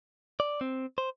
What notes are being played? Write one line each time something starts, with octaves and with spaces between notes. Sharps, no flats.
D5
C4
C5